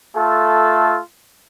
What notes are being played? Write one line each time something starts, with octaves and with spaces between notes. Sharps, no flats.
A3 F4 A4